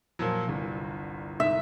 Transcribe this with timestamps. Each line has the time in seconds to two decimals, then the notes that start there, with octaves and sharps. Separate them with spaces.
0.19 A#2 F3 F#3
0.47 G1 C2
1.40 C2 G#2 E5